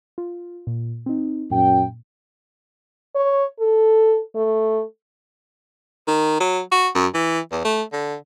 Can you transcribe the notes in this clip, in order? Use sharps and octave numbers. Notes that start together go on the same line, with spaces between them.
F4
A#2
C4 D#4
F#2 A#2 G5
C#5
A4
A3
D#3
F#3
F#4
F#2
E3
E2
A3
D3